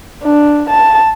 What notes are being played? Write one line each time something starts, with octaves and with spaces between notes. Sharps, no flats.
D4
A5